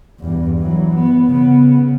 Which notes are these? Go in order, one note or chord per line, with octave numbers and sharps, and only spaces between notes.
E2 G2
E3 F#3
B3
C#3 B3